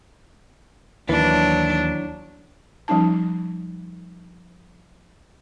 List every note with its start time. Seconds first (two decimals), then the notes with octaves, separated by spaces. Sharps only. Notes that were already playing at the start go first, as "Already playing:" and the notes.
1.09 D#2 E3 F#3 D4
2.88 F3 G3 C#4 D#4 A5